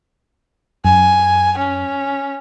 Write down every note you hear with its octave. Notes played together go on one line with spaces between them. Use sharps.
F#2 G#5
C#4